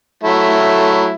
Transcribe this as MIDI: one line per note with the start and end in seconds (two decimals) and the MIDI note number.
0.24 1.14 54
0.24 1.14 57
0.24 1.14 64